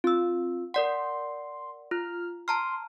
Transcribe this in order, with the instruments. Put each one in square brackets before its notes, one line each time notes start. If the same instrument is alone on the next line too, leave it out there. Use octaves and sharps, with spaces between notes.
[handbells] C4 E6 [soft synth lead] F4
[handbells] A#4 D5 F#5 [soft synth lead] C6
[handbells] F4 [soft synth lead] F6
[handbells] A5 A#5 F6 [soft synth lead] C6